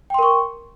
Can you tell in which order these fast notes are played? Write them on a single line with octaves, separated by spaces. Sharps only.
G5 C6 A#4 C#6